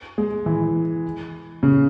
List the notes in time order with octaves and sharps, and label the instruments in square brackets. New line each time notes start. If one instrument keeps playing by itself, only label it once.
[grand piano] G#3
E3
C#3